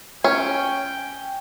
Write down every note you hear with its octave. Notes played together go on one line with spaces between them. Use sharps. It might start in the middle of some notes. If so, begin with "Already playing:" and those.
C#4 G5